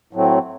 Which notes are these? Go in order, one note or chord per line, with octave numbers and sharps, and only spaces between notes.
A2 F#3 A3 C4